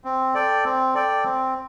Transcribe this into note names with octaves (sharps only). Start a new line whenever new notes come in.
C4
A4 D5 G5
C4
A4 D5 G5
C4